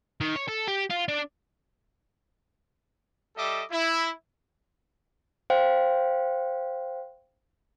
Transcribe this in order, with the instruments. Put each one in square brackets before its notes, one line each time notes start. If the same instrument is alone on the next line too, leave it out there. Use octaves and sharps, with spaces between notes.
[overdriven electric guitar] D#3
C#5
A4
G4
F4
D4
[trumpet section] G3 A4 D#5 E5 D6
E4
[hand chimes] C5 F5 G5